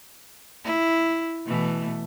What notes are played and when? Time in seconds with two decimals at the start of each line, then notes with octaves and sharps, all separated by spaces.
0.64 E4
1.46 B2 E3 A3